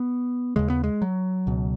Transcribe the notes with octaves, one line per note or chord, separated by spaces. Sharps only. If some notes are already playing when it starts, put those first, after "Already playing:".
Already playing: B3
D#2 C#3 G#3
B3
G#3
F#3
C#2 B2